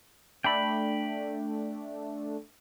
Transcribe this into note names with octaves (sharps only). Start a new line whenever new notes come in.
A3 D4 G5 B5